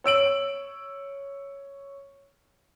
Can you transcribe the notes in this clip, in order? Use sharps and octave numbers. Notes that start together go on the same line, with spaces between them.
C#5 E6 D7 F#7